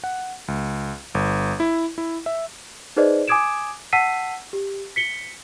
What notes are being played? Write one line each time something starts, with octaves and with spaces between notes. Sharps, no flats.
F#5
C#2
G1
E4
E4
E5
D#4 G#4 B4 C5 D5 D#5
G#5 D6 D#6 G#6 D7 E7
F#5 A5 E6 B6 C7 D#7
G4
B6 C#7 G7